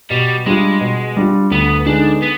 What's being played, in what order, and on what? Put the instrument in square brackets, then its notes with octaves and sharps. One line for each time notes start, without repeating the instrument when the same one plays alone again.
[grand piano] B2 [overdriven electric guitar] G3
[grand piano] G3 D4 F4 [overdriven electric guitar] G#3
[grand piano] B2
G3 D4 F4
[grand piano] D2 [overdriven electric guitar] B3
[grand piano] D3 G#3 B3 D#4 [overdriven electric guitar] D4
[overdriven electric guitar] B3